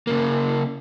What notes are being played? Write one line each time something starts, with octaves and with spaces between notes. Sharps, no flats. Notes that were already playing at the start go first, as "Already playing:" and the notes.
C#3 A#3